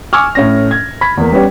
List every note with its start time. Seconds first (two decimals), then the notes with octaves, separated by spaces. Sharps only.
0.13 G#5 C#6 D6 E6 F6
0.35 A2 C#4 A#6
0.71 G#6
1.01 B5 G#6 B6
1.17 E2 A#3
1.32 G3 B3 C#4 G4